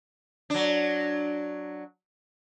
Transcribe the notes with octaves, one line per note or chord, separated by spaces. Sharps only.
F#3 D4